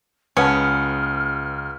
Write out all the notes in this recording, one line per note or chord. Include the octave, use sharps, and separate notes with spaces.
C#2 C#4 B4 F#5 A5 D#6 F6 C#7